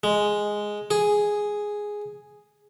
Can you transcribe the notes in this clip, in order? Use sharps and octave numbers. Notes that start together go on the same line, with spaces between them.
G#3
G#4